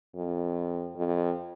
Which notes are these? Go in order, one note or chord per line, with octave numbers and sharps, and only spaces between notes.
F2
F2